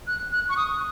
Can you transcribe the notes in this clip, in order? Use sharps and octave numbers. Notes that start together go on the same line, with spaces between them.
F#6
F#6
C#6
D#6